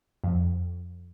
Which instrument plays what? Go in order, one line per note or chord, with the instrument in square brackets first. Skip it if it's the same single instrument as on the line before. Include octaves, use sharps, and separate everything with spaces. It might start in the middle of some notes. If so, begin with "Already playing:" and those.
[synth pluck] F2